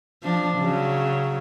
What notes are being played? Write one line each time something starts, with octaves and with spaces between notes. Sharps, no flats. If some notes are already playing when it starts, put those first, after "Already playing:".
F3 D4
C#3 F#3